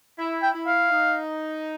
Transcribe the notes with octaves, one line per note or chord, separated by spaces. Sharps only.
E4
G5
E4
F5
D#4